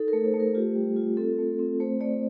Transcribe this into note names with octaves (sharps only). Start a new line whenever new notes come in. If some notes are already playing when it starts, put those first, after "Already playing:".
Already playing: D#4 A4
A3 A#4
C5
A3
A#4
F4 G4
G3
F4
C4 A4
A3
C4
A3 C5
A3 D5